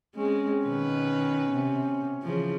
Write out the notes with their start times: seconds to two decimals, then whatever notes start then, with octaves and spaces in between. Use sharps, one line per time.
0.16 G#3 C4 C#4
0.64 B2 D#3 B4
1.52 C3 B3
2.22 C#3 E3 F3